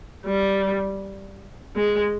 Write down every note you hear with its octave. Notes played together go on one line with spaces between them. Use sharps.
G3
G#3